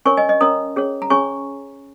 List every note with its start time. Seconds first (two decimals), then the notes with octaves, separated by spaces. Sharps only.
0.05 C#4 A#4 C#5 G#5 C#6
0.17 D#5 G#5
0.29 D#5
0.41 C#4 A#4 C#5 A#5 D#6
0.76 C#4 G#4 C#5
1.02 A#5
1.10 C#4 G#4 C#5 G#5 C#6